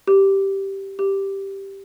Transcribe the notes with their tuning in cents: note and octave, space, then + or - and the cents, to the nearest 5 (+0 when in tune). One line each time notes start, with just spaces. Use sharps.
G4 -5
G4 +0